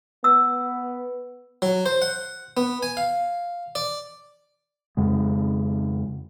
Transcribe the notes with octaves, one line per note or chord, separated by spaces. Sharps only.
B3 E6
F#3
C5
F#5
B3
G#5
F5
D5
F2 C#3 G#3